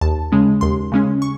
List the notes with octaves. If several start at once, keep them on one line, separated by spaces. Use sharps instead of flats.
D#2 A5
C#3 G#3 C#4
D#2 C6
C#3 G#3 C#4
C#6